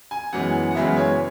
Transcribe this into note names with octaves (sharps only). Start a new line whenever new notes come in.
G#5
F#2 E3 G#3 B3 F#5
F#5
F#2 C#3 E3 G#3 B3 E5
C#5